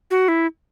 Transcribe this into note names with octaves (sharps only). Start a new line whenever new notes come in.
F#4
E4